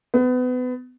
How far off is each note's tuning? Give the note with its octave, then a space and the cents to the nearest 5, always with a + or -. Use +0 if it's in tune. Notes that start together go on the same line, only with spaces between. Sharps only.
B3 +30